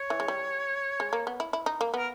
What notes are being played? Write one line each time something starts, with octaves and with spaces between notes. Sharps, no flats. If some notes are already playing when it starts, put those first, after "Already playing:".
Already playing: C#5
E3
G#3
G3
G#3
A#3
B3
E4
E4
D#4
A#3
B3 A#4